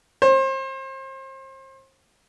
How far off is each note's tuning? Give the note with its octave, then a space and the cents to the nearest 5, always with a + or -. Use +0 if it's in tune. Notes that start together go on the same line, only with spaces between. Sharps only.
C5 +35